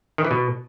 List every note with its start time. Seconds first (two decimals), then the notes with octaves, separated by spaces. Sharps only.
0.18 D#3
0.25 E3
0.31 B2